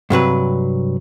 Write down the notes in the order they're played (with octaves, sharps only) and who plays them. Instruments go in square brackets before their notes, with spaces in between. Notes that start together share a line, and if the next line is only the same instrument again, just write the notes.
[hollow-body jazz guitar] G2 C3 F#3 B4